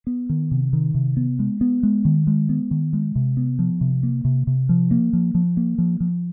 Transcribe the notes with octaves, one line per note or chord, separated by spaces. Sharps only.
B3
D#3
C3
D#3
C3
B3
G#3
B3
G#3
D#3
G#3
B3
D#3
G#3
C3
B3
F3
C3
A#3
C3
C3
F3
A#3
F3
F3
A#3
F3
F3